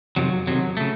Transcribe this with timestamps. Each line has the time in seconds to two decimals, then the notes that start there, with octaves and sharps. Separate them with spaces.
0.16 F2 C3 D#3 F#3
0.47 F2 C3 D#3 F#3
0.77 C#3 A3